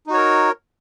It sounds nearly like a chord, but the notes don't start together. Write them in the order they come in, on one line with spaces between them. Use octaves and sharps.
D#4 F#4 C#5 A#4